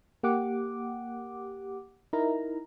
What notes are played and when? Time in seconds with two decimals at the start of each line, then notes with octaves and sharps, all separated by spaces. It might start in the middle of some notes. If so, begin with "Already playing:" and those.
0.23 A#3 G4 F#5 D6
2.13 D#4 E4 A#4 A#5